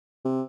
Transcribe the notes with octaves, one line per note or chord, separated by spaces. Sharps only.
C3